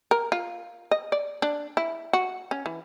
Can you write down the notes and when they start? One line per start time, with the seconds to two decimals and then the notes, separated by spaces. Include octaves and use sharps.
0.11 A#4
0.32 F4
0.91 D#5
1.12 D5
1.42 D4
1.77 E4
2.13 F#4
2.51 C#4
2.66 E3